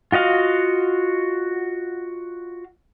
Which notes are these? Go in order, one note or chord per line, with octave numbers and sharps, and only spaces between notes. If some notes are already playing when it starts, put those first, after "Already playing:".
F4 F#4 D#5 F5